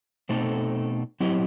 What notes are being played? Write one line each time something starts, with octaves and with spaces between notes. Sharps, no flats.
B2 A3 C4 D#4 A4
F#3 C4 E4 G4 D#5